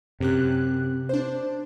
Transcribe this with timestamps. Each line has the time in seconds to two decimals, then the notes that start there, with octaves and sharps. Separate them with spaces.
0.20 F#2 C3 G4 F#6
1.09 D4 C5